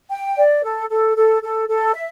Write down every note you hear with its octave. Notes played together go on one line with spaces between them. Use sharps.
G5
D5
A4
A4
A4
A4
A4
E5